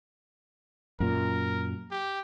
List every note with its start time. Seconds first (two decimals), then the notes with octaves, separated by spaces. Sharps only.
1.00 F#2 A#2 A#4
1.91 G4